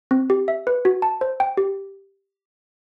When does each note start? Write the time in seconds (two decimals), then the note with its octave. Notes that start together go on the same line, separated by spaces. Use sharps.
0.11 C4
0.30 G4
0.48 E5
0.67 B4
0.85 F#4
1.02 A5
1.21 C5
1.40 G5
1.57 G4